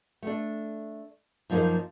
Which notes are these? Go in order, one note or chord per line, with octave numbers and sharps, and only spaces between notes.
A3 D4
F#2 F3 A#3 D#4 C5